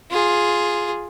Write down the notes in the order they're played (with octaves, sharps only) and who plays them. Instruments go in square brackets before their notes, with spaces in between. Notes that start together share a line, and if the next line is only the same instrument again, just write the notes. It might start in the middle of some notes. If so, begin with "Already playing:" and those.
[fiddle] F4 G#4